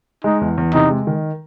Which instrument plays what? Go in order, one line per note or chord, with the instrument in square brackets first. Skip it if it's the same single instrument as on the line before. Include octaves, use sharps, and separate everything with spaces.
[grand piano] G#3 [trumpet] D#4
[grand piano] E2
E2
[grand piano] C3 [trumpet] D#4
[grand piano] G#3
D#3